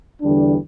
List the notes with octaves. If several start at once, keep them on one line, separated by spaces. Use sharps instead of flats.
E2 D3 G3 D4